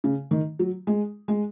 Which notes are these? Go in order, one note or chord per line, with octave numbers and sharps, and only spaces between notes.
C#3
D#3
F#3
G#3
G#3